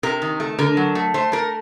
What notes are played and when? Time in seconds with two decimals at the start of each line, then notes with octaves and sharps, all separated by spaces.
0.03 C3 A#4
0.22 D#3
0.40 A3
0.59 D3 A#4
0.77 F#3
0.95 A3
1.14 A3 C5
1.32 A3 A#4